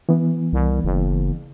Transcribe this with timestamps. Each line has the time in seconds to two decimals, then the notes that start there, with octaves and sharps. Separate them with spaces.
0.09 E3 B3
0.53 C2
0.84 F#1